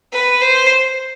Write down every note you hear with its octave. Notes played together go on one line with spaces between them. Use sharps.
B4
C5